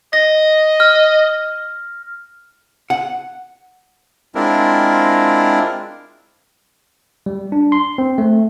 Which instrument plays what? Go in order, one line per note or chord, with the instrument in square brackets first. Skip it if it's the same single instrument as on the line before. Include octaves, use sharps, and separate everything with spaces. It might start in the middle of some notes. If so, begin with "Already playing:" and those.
[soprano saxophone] D#5 [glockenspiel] A#6
[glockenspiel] F6
[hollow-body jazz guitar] F#5
[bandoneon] G#3 C4 D4 E4 F4 A#4
[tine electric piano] G3
D4
C6
C4
A3